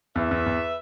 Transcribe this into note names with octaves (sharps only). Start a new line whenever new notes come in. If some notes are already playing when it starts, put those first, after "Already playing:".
E2 B4 E5
E2
E2